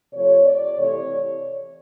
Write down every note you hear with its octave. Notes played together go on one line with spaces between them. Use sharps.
C3 F3 A3 C#5
D5
C3 E3 A3 C#5